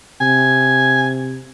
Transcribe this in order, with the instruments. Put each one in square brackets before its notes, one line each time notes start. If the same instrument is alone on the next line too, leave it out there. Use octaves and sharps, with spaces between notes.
[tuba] C3 [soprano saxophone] G#5